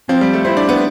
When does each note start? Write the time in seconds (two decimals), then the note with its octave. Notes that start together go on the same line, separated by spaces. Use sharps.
0.09 F3 C4
0.21 G3
0.33 A3
0.45 C4 E4
0.57 D4
0.69 B3